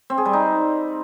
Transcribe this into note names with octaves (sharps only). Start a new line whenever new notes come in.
C4
G#4
G3
D#4